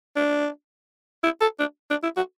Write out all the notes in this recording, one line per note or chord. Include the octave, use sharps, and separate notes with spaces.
D4
E4
A4
D4
D4
E4
F#4